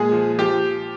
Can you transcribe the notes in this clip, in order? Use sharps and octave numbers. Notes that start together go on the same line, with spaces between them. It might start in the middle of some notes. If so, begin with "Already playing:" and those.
Already playing: A#2 G#3 G#4
F3
F3 G4